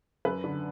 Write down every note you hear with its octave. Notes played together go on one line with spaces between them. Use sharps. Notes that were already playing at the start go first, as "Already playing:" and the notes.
F#2 B4
D3